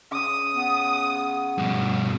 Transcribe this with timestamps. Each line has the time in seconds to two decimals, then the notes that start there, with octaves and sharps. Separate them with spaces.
0.11 C#3 D#6
0.53 B3
1.58 G2 B2